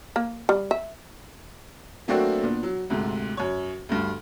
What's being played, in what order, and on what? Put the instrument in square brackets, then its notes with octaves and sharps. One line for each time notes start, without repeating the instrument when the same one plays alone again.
[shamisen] A#3
G3
E5
[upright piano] F#3 A3 A#3 C4 D4 F#4
A#2 B3 D4
F#3
D2 G#2 C3
F#2 C#5
D2 G2